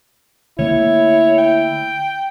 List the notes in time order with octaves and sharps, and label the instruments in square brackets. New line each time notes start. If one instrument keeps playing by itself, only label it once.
[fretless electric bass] D3 A3 A#3 [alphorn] E4 [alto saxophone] C#5
[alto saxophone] G5